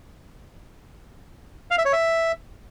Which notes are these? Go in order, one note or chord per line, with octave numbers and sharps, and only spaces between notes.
F5
E5
C#5
E5